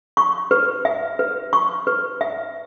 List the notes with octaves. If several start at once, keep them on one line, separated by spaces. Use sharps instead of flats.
C#6
B4
E5
B4
C#6
B4
E5